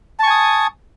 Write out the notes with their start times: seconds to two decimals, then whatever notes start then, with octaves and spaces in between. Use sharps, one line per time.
0.19 A5
0.23 C#6
0.27 G#5
0.30 D#6